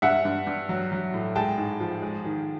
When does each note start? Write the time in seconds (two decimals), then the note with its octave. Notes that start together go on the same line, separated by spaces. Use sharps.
0.02 G2 E5 F#5
0.25 G2
0.47 G2
0.69 F#3
0.92 F#3
1.14 A2
1.36 G#3 G5 A5
1.58 G#2
1.80 F3
2.02 G#3
2.25 D#3